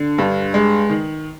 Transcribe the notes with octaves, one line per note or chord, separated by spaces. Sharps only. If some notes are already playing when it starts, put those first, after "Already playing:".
Already playing: D3
G2
G#3
D#3